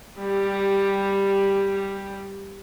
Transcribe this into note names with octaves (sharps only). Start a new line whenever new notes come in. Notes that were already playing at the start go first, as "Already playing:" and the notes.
G3 G4